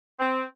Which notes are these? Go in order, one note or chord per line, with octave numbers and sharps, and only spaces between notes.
C4